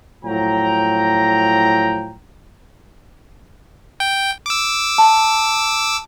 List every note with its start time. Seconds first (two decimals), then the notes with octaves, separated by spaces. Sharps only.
0.24 A2 F3 F#3 G5 A#5
4.00 G5
4.46 D6 E6
4.98 A5